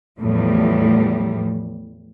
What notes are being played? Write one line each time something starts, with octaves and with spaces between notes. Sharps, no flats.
E2 A2 F3 G3